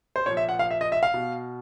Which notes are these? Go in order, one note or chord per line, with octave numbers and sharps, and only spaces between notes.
C5
A#2 F3 C#5
E5
F#5
F5
E5
D#5
E5
F5
B2